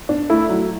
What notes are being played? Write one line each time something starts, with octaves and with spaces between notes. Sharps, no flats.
D4
A3 E4
F#3